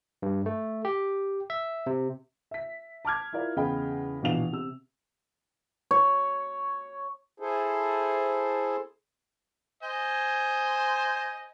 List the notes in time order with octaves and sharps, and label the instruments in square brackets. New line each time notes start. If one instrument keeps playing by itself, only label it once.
[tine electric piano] G2
A3
G4
E5
C3
[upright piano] E5 B6
A5 D6 F6 G#6
E4 F4 A#4 D5 F5
E2 C#3 D#5 F5 G5 B5
A#1 B2 E3 D4 F5 F7
C3 E6
[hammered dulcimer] C#5
[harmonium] E4 G#4 A4 C5
[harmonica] C5 D#5 G#5